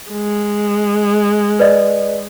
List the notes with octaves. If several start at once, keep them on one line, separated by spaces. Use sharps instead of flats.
G#3
B4 D5 D#5